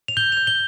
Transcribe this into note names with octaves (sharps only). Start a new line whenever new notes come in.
F7
G6 G7
G6 F7
G7